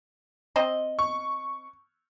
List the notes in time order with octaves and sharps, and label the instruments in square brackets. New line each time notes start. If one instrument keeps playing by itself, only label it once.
[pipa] C4 C5 D#5
[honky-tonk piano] C#6